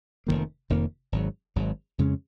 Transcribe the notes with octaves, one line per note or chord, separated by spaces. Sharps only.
F1 F2 D#3 A#3
F1 F2 D#3 A#3
G#1 G#2 F#3
G#1 G#2 F#3
F2 C#3 G#3 C#4